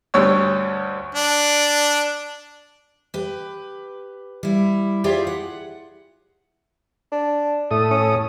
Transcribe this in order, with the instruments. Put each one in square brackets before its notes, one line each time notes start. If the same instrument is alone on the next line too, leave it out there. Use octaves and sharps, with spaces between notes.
[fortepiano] D2 G2 C#4 C#5 E6
[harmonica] D4
[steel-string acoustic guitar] G4 B4
G3 E4
F4 G4 G#4 C5 D5 E5
F#5
[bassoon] D4
[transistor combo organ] A2 A4 D#6 [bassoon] A3
[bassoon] C#4